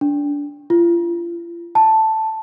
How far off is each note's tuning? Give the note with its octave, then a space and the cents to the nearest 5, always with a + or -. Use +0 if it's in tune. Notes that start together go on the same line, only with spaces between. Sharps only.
D4 -25
F4 -35
A5 +0